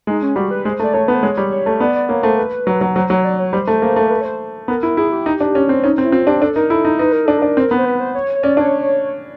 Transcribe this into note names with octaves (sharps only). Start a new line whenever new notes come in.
G#3 D#4
C#4
G3 F#4
B4
G#3 C5
A3
D5
A3 C#5
B3 B4
C5
G#3 C#5
G3
C#5
A3
B3 D5
D5
A#3 C#5
A3 C5
B4
F#3
F#3
F#3 C5
F#3 C#5
D5
C#5
G3 C5
A3
A#3
A3
A#4
B4
C#5
C5
B3 A#4
E4 A#4
E4 G#4
G4
D#4
D4
C#4
C4
C#4 D#4
C4
E4
C4 F4
D4 G4
D4 A4
D#4 A#4
E4 A4
D#4
D#4 B4
A#4
D4 A4
D4 A#4
C4
B3
C5
B4
C5
C#5
C#5
C#4 D5
D4 C#5